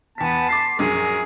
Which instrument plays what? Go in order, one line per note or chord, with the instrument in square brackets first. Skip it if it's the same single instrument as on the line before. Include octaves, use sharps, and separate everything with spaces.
[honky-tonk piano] E2 B6 [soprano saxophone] B3 [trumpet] A5
[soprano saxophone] C6 [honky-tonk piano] D6 A6 B6
[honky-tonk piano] A#1 F#2 [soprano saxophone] G#4 [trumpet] A#4